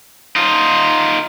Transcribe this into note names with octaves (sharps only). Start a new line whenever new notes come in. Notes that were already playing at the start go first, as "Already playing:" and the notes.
D#4 F4